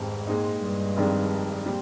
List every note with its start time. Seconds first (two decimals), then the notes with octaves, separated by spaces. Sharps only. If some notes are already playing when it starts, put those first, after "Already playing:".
Already playing: F1 F2 G#2 D#3 G3 C4
0.27 A#2 G#3 C4 D#4
0.62 G2
0.97 F1 F2 D#3 G#3 D4
1.66 A#2 G3 C4